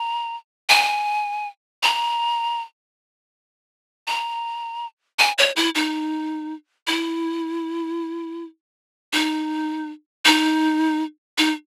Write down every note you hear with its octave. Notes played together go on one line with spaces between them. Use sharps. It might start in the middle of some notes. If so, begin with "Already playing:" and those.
Already playing: A#5
G#5
A#5
A#5
G#5
C#5
E4
D#4
E4
D#4
D#4
D#4